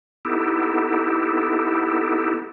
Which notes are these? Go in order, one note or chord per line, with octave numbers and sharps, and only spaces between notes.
B3 D#4 E4 G4 A4